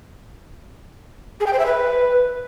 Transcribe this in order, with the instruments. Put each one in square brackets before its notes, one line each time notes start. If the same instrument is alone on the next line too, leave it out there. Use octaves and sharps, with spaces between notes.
[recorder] G#4
G5
C5
E5
B4